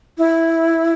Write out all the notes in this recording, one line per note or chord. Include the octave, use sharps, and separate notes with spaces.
E4